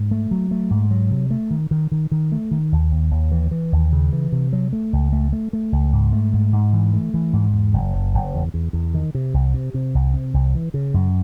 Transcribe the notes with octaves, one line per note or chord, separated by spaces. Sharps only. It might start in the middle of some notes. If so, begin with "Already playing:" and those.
Already playing: G#2
A3
F#3
A3
G#2
F#3
C3
A3
D#3
D#3
D#3
D#3
A3
D#3
D#2
D#2
D#2
E3
E3
D#2
C#3
E3
C3
F#3
A3
C#2
A3
A3
A3
C#2
G#2
A3
G#2
G#2
E3
A3
E3
G#2
E2
F#1
F#1
F#1
E2
E2
E2
D#3
C3
C2
C3
C3
C2
C3
C2
E3
C#3
F#2